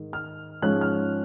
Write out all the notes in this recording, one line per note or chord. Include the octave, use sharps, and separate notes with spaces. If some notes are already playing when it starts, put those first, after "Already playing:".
Already playing: G#2 D#3 G#3
F6
G#2 F3 G#3 C#4 F#6
F6